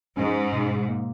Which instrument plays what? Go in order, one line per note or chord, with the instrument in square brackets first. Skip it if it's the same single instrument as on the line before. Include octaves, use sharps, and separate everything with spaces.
[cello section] G#2 [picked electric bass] C#4
[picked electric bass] B2
A#3